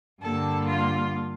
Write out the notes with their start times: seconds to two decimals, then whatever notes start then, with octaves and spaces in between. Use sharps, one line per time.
0.22 G2 D3 G3 A#3 A4
0.67 F4